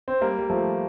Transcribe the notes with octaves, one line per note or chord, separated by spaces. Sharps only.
C4
G3 A#3
G3
F3 A3